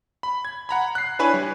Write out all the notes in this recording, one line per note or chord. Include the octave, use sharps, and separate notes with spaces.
B5
G#6
F#5 A#5 B5
F#6 C7
D4 E4 B4 C#5 G#5 C#6
G3